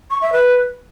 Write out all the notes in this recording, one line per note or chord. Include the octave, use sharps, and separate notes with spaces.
C#6
E5
B4